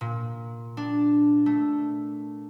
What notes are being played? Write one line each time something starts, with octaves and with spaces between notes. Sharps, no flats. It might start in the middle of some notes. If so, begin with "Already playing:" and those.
A#2
D4
A3